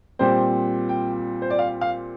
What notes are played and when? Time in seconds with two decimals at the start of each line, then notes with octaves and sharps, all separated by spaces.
0.19 A#2 G3 C4 C5
0.89 G5
1.42 C5
1.50 D5
1.59 F5
1.81 F5